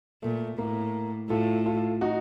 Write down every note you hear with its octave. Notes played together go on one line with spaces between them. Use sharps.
A#2 A3
A2 A#3
A2 F4 A4
F4 A4
D#4 F#4